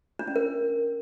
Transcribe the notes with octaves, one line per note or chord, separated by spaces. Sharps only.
D4
C#4
A#4